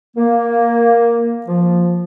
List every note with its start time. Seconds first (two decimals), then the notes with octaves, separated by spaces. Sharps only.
0.17 A#3
1.47 F3